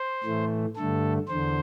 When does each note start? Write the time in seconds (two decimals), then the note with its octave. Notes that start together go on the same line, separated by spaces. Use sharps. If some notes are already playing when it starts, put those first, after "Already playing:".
Already playing: C5
0.24 A2 E3 A3
0.77 G2 D3 A3 A4
1.28 E2 D3 C5